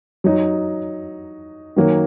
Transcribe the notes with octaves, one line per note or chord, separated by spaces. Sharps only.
F#3 D#4
D#3 F#3 A#3